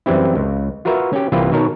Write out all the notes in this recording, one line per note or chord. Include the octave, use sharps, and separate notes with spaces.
F#2 E3 G3 C4 E4
C#2
F4 F#4 A#4 B4 E5 F5
C#4 G4
C2 E3 A#3 F4 G4 B4
B2 D#3 A#4 C#5 A5